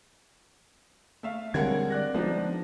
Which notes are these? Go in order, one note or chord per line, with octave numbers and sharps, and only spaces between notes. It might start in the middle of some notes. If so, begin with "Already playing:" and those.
A3 E5 F5
D3 G3 G#3 C4 A#4 C#5 F#5 G#6
D5 F#6 A#6
F3 G#3 B3 D4 D#4